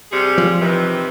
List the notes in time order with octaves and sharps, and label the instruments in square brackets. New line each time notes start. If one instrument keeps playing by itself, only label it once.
[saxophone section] C3 G3 G#4
[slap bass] F3
[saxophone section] C3 D#3 E3